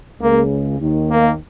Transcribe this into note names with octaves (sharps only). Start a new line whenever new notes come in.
C#2 C#3 A#3
D#2 D#3
A#3